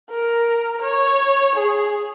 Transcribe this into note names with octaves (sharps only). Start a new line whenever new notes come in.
A#4
C#5
G#4